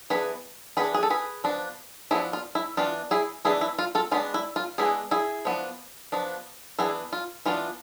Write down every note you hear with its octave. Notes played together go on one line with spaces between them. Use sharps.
E3 B3 D4 G#4 B4
E3 B3 D4 G#4 B4
G#4
A4
G#4 B4
F3 B3 D4
F3 B3 D4 E4 G#4
F4
E4
E3 B3 D4 F4
E4 G#4
E3 B3 D4 E4 G#4
E4
F4
F4 A4
G#3 B3 D4 F4
E4
F4
G#3 B3 D4 E4 G#4
E4 G#4
F3 B3 D4
F3 B3 D4
E3 B3 D4 E4 G#4
F4
E3 B3 D4 F4